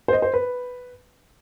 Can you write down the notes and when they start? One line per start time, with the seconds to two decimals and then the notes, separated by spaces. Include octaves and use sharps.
0.08 C5
0.13 D#5
0.22 C5
0.34 B4